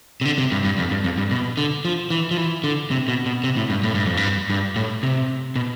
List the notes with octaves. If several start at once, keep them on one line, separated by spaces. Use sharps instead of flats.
C3
D3
C3
G2
G2
F2
G2
F2
G2
B2
D3
F3
E3
F3
E3
D3
C3
B2
B2
C3
A2
G2
A2
G2
F2
G2
G2
A2
C3
B2